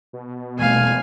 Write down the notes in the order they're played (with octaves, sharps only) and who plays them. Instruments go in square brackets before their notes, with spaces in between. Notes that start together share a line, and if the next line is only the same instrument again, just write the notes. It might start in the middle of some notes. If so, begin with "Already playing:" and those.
[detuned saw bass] B2
[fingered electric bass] E1 C2 A3 [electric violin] F5 G#5